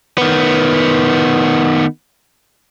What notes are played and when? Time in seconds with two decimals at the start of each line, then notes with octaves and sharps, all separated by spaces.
0.18 D#3 B3